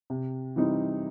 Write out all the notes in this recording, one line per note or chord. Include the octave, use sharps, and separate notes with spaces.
C3
E3 G3 C4 D#4